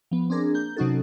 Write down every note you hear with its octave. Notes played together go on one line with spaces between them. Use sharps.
F3 B3
C4 D4 G#4 A#4
A#3 G6
C3 F#3 C#4 D#4 F#4 A4